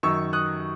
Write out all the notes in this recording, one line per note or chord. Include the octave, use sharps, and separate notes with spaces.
F#2 D#3 C#6 E6
D#6 F#6